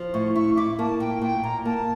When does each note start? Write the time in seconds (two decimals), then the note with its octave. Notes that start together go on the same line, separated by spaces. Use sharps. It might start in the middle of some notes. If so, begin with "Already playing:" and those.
Already playing: F3
0.14 A2 C#6
0.35 E4 C#6
0.57 E4 D6
0.79 A#3 A5
1.00 A#2 G5
1.22 A#2 G5
1.44 A#2 A#5
1.65 A#3 A5